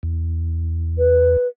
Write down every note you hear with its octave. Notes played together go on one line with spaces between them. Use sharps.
E2
B4